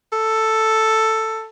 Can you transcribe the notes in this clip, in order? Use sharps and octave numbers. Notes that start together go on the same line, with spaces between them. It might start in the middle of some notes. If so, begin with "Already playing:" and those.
A4